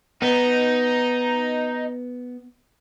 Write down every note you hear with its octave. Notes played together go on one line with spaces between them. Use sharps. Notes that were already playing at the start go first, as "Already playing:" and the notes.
B3 D#4